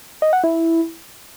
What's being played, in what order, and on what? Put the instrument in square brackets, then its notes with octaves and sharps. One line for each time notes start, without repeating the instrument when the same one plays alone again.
[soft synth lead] D#5
F#5
E4